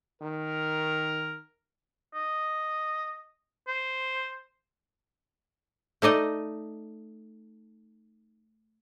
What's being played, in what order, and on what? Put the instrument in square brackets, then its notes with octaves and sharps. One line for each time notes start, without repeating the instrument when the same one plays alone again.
[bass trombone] D#3 [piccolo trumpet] A#4
[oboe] D#5
C5
[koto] A3 D#4 D5 D#5